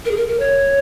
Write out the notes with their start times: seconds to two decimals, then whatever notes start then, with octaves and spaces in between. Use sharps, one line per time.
0.05 A#4
0.11 G#4
0.17 A#4
0.28 A#4
0.39 C#5